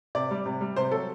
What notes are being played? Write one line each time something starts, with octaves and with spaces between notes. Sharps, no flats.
C3 D5
G3
C3
G3
C3 C5
F#3 A4